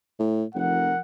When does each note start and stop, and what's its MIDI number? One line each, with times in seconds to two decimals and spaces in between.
0.19 0.44 45
0.55 0.91 29
0.55 0.99 53
0.55 0.99 70
0.55 0.99 78